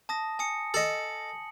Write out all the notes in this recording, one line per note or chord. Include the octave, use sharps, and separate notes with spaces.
A5 D#6 A#6
G#5 D#6 C#7
A4 D#5 C#7 F#7